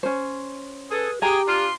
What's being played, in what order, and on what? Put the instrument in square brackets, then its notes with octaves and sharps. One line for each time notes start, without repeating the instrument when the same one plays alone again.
[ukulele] C#4 C5
[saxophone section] G#4 [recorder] A4 [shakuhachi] B4
[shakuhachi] G4 [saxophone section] G#4 [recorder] G5 [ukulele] A#5
[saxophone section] D4 F4 [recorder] C6